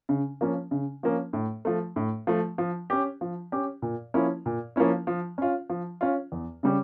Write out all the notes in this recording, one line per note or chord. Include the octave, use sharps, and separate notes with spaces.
C#3
F3 A#3 C#4
C#3
F3 A#3 C#4
A2
F3 A3
A2
F3 A3
F3
C#4 G4
F3
C#4 G4
A#2
F3 A#3 C#4 E4
A#2
F3 A#3 C#4 E4
F3
C#4 F4
F3
C#4 F4
E2
C#3 G3 C#4 G4